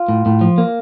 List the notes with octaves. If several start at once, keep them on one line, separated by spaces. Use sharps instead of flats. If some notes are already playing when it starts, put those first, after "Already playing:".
Already playing: F4
A2
A2
F3
A#3